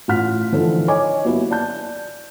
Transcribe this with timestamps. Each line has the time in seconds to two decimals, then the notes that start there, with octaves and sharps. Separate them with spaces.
0.08 A1 F4 F#5 F6 B6
0.52 D3 E3 F3 D#4 A4
0.88 C#5 D#5 G#5 D6
1.24 F#3 A#3 B3 E4 G4
1.50 D5 A5 G6